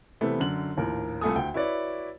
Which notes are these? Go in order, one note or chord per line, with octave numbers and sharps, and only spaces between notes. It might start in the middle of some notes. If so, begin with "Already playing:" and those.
C3 E3 A3 B3
F#2 D3 F#7
A#1 D#2 A2 A#4
C2 A3 F4 A4 G#5 D#6
D2 G5
E4 F#4 B4 C#5 D5